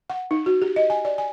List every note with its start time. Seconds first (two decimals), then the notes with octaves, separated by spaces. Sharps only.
0.10 F#5
0.31 D#4
0.46 F#4
0.62 G4
0.76 D#5
0.90 G#5
1.05 D5
1.18 G#5